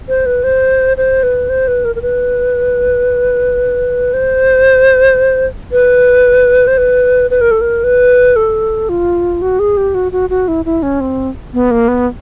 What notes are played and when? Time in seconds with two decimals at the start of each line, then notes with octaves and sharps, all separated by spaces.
0.08 C5
0.26 B4
0.44 C5
0.97 C5
1.23 B4
1.50 C5
1.68 B4
1.85 A#4
1.95 A#4
2.02 B4
4.14 C5
5.72 B4
6.67 C5
6.78 B4
7.31 B4
7.41 A#4
7.51 A4
7.61 A#4
7.84 B4
8.36 A4
8.89 F4
9.42 F#4
9.59 G#4
9.77 G4
9.95 F#4
10.12 F#4
10.30 F#4
10.48 E4
10.65 E4
10.83 C#4
11.01 C4
11.53 B3
11.71 A#3
11.88 B3